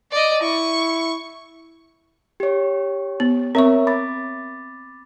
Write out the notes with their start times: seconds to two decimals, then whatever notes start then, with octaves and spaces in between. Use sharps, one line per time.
0.11 D5 D#5
0.42 E4 C#6
2.40 G4 C#5
3.20 B3
3.55 C4 A#4 C#5 E5 C#6
3.87 B5 D6 A6